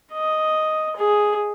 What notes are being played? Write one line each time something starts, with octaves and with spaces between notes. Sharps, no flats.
D#5
G#4